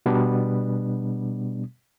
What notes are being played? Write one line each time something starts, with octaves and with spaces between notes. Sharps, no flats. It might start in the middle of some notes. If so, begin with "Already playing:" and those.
B2 G3 B3 D4